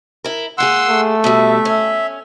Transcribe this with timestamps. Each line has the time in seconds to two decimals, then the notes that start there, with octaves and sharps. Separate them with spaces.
0.24 E4 A#4
0.58 G#3 A#3 G#4 F#5 C6 E6
0.88 A3
1.24 B2 G3 E5
1.65 C#4